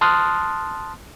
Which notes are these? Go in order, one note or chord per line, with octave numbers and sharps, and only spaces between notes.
A5 C6 D#6 F6 F#6 A6